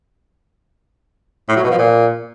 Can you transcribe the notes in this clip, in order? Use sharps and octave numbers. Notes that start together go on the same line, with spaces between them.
A2
F#3
B2
F3
A#2